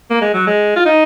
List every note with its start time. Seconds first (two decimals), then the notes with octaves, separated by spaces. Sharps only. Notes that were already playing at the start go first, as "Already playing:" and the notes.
0.11 A#3
0.22 G#3
0.34 F#3
0.47 G#3
0.76 F4
0.86 D#4